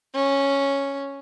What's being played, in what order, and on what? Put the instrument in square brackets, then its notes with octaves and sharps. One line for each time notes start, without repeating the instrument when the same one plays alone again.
[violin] C#4